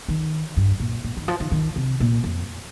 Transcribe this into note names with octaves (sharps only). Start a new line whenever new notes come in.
D#3
G2
A#2
A#2
D#3
F3
D#3
D#3
C3
A#2
F2